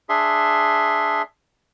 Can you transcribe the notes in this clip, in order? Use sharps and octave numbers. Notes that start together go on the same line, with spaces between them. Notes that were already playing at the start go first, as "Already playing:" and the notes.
D4 G#4 E5 C6